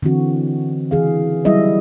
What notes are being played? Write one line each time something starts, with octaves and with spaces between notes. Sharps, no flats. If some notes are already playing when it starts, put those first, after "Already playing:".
D3 E3 C4 F#4
C#3 E3 G#4 F5
F#3 G3 E4 G#4 D#5 E5